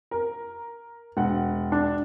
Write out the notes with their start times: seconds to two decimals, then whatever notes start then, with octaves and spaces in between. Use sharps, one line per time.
0.11 A#4
1.17 E1 F#5
1.72 D4